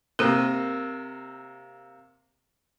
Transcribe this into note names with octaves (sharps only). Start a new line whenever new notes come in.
C3 A#3 G4 A#4